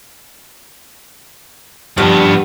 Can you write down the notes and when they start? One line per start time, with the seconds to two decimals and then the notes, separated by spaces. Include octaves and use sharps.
1.98 G2 F3 B3